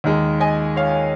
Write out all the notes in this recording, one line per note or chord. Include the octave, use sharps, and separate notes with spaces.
D#2 D#3 G#3
D#5 G#5
C#5 F5